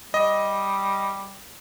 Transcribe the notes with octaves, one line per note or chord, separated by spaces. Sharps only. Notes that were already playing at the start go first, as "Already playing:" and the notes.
G3 D#5